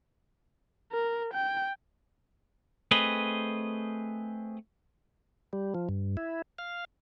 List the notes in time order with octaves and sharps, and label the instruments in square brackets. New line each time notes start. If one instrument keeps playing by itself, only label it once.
[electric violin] A#4
G5
[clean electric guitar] A3 C4 G#4 B4 D#5
[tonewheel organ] G3
F3
G2
E4
F5